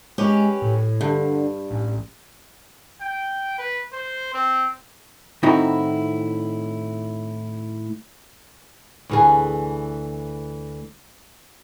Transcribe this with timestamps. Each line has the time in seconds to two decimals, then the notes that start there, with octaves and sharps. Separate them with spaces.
0.18 G#3 C#4 G4 B4
0.62 A2
1.01 G2 D3
1.70 A1
3.01 G5
3.59 B4
3.93 C5
4.34 C4
5.43 A2 D#3 C4 D#4 E4 F#4
9.09 D2 E3 G#4